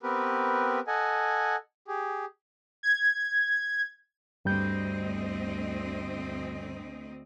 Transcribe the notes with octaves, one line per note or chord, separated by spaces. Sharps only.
B3 C4 G4 A#4 B4
A4 D#5 F#5 G#5
G4 G#4
G#6
D2 G2 G3 C4 D#5 G6